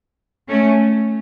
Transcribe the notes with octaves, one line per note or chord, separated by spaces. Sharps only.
A3 C#4